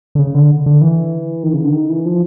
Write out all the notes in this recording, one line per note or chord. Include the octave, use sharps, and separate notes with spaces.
D3
C#3
D3
D3
E3
D#3
C#3
D3
D#3
E3
F3